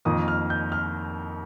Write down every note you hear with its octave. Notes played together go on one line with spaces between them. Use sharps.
F2 D#3 A#3 D#6
F6
G6
F6